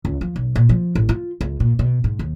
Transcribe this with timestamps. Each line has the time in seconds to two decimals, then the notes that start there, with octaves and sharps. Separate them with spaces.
0.05 C#2
0.21 F3
0.36 B1
0.55 A#2
0.69 F3
0.95 A1
1.09 F4
1.41 C#2
1.60 A#2
1.79 B2
2.04 G#2
2.19 D#2